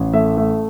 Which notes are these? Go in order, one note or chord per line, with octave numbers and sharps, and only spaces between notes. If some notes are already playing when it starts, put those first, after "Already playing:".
Already playing: A1
A3 E5
A3 E5